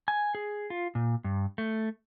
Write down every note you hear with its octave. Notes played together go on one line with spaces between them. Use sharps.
G#5
G#4
F4
A#2
G2
A3